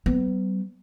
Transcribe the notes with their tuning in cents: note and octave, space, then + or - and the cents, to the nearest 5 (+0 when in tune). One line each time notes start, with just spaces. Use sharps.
G3 -45 B3 +35